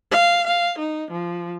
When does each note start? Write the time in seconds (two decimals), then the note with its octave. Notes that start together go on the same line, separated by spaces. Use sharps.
0.11 F5
0.47 F5
0.78 D#4
1.11 F3